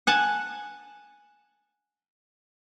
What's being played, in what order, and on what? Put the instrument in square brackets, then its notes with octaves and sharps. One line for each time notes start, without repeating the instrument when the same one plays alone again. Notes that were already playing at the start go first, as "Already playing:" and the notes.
[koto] F#5 G#5 A5